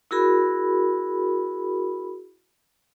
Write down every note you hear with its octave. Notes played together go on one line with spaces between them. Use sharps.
E4 F#4 G#4 A#4 B5